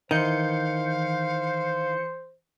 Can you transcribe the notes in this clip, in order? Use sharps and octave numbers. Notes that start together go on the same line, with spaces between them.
D#3 E3 C5 F5 G6 C#7